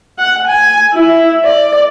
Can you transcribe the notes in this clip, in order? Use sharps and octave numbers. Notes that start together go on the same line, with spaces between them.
F#5
G#5
E4
D5